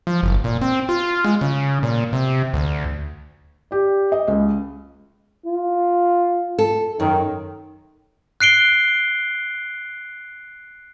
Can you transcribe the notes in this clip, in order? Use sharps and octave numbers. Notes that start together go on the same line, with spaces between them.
F3
F#1
A#2
C4
F4
G#3
C#3
A#2
C3
D2
G4 D5
D#5
C#2
F4
A4
F#2 D#3
F#6 C7 D7 G7